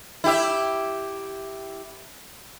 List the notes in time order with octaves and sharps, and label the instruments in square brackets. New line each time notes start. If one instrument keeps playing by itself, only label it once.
[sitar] E4 G4 E5